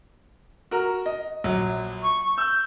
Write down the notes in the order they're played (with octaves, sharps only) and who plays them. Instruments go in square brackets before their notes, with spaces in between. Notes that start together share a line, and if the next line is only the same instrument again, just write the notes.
[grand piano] F#4 A#4
D#5
A#1 F#3
[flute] C#6
[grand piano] E6 [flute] G6